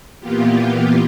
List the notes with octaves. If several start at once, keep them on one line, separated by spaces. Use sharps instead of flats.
A#2 E3 A#3 B3 F4 G4